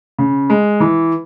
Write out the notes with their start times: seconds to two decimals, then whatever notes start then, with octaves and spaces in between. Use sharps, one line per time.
0.18 C#3
0.50 G#3
0.80 E3